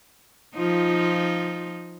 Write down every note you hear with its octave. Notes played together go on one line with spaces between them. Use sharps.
F3 D#4 F4